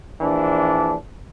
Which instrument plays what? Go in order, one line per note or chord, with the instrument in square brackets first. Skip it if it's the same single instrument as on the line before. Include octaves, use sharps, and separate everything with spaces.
[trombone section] A#1 E3 D4